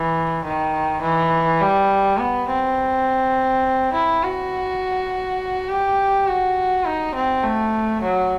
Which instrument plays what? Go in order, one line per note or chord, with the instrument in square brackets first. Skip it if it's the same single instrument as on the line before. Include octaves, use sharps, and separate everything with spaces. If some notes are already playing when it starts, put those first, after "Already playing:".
Already playing: [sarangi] E3
D#3
E3
G3
B3
C4
E4
F#4
G4
F#4
D#4
C4
A3
F#3